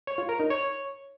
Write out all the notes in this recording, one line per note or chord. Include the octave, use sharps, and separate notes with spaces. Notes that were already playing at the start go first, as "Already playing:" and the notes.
C#5
F4
A#4
D#4
C#5